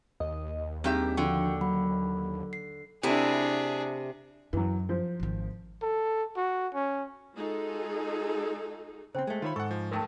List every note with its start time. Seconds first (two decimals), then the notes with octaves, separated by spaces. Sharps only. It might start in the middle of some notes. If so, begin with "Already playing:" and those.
0.20 D#2 D#5
0.84 G2 C4 D#4 G4 G#4 E5 A#5
1.17 D3 F3 F#4 G5 C#6
1.61 F#3 B5
2.53 C7
3.03 C3 A3 D4 E4 G#4
4.53 F#2 E3 F#3
4.89 F3 C5
5.20 G#1 D#3
5.82 A4
6.37 F#4
6.74 C#4
7.34 G#3 D#4 F4 F#4 G#4 A4
9.15 C#3 C4 C5 G5
9.27 G#3 A3
9.42 D#3 F4 B4 C#5 E5 B5
9.56 G#2 A4 F#5 C#6
9.71 F3
9.91 A1 D#2 A3 A#4 G5 A5